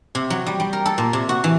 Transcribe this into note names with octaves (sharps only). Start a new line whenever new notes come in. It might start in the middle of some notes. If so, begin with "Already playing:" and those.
C3
F#3
G3
G3
A#4
A4
A#2
C3
F#4
E3